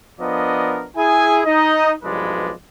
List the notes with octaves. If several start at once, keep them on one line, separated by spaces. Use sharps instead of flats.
F3 B3 D4 A#4 D5 D#5
E4 G#4 G#5
D#4 D#5
B1 G2 F3 G#3 B4 D5